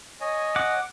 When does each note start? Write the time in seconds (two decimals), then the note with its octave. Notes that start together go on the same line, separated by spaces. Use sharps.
0.21 C#5 D#5 G#5
0.56 F#5 D6